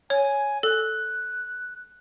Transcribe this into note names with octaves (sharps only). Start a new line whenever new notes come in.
C#5 G#5
A4 F#6